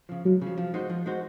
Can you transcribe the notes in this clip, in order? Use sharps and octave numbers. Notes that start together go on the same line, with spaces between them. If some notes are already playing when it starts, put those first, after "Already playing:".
C#3 F3
C#2 F#3
C#3 F3
F3
G#3 D#4 F#4 C5
F3
G#3 D#4 F#4 C5